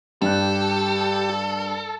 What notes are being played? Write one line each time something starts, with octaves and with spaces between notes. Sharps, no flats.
G2 G4 A4 F#6